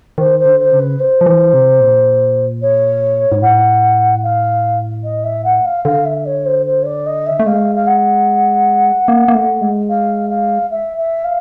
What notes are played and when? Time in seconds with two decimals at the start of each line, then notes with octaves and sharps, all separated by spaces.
0.18 D#3 C5
0.39 C5
0.45 D3
0.59 C5
0.72 C#3
0.79 B4
0.99 C5
1.21 F3
1.26 E3
1.53 C3
1.80 A#2
2.62 C#5
3.32 G#2
3.42 A2 F#5
4.23 F5
5.03 D#5
5.24 E5
5.44 F#5
5.65 F5
5.85 D3 F5
6.05 E5
6.25 C#5
6.45 C5
6.65 C5
6.82 C#5
6.85 D5
7.06 D#5
7.26 E5
7.39 A3
7.46 G#3 F5
7.75 F5
7.87 F#5
9.08 A#3
9.28 A#3
9.35 A3
9.61 G#3
9.89 F5
10.29 F5
10.70 E5
10.97 E5
11.24 F5